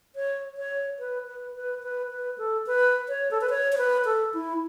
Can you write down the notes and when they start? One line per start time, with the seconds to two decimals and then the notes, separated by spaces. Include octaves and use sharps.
0.16 C#5
0.57 C#5
0.99 B4
1.28 B4
1.55 B4
1.83 B4
2.11 B4
2.38 A4
2.67 B4
3.09 C#5
3.31 A4
3.41 B4
3.50 C#5
3.72 C#5
3.78 B4
4.05 A4
4.34 E4